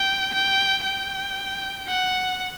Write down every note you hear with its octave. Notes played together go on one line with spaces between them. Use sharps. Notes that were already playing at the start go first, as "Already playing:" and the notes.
Already playing: G5
G5
G5
F#5